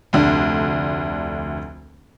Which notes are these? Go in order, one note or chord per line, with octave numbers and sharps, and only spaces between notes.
F1 D2 D4